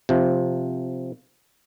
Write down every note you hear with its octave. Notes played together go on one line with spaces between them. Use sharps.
C3 F3